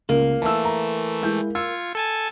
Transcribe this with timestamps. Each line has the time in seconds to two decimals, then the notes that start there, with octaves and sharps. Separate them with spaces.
0.09 C#2 A#3
0.42 E3 A3 A5 E6
0.64 A#5
1.22 G#3 E4 G6
1.55 F4 E6 G#6 C#7
1.95 A4 G#5 A5